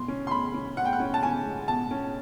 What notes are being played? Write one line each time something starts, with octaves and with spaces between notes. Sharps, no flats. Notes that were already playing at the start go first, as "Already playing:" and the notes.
Already playing: B2 G#3 C6
C#4
C6
B2 B5
C#4
B2 F#5
G5
F#5
C#4
A5
C#4 G#5
G#3
B2 A5
C#4